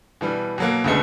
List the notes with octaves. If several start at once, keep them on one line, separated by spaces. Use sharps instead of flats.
B2 E3 G3
B2 F#3 A#3
C#2 B2 D3 G#3 A3 B3